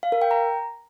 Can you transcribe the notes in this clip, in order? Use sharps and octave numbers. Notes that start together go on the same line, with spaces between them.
F5
A#4
G5
A#5